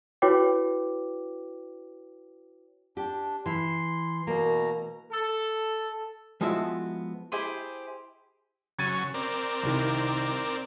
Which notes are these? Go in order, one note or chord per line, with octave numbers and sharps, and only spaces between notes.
E4 F#4 B4 C#5 G5 D6
D4 G4
E3 E4 C6
B2 A#3 A#5
A4
F3 G#3 B3 E4 F#4 E5
E4 G4 G#4 C5
C#3 F#3 C#6 G#6 A6 D#7
C4 A#4 D5
C2 C3 D#3